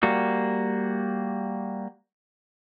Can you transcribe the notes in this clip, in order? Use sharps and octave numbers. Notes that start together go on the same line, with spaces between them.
G3 A#3 F#4